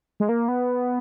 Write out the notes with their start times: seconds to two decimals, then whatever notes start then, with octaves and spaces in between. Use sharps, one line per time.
0.20 G#3
0.29 A#3
0.48 B3